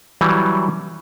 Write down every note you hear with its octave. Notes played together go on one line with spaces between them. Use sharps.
E3 F#3 G3